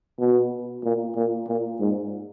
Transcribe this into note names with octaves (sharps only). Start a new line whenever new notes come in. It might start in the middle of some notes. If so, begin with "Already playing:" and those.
B2
A#2
A#2
A#2
G#2